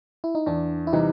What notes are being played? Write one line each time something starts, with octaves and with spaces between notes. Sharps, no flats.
E4
D#4
E2 D4
E4
C3 E3 G3 D#4